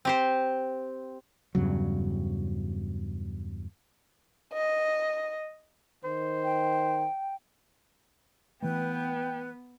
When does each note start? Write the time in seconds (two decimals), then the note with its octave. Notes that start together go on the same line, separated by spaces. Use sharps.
0.05 C4 G4 C5
1.55 E2 G2 C#3 F#3
4.53 D#5
6.04 D#3 C5
6.44 G5
8.63 E3 A3 B3 B4 G5